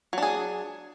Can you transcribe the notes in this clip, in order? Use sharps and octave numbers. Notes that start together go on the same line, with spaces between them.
F#3 D4 G#4